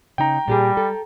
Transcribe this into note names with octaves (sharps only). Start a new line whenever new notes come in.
C#3 D#4 G5 A#5
A#2 G3 G4 G#4
A4